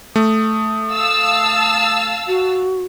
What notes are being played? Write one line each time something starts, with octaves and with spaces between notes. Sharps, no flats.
A3 D#6
F5 A5 E6
F#4